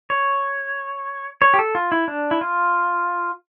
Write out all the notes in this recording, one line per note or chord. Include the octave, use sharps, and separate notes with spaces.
C#5
C#5
G4
A4
F4
E4
D4
E4
F4